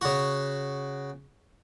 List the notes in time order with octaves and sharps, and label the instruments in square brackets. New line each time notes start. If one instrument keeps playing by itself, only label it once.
[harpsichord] C#3 F#4